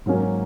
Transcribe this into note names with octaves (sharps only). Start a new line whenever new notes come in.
G#2 F#3 A#3 C#4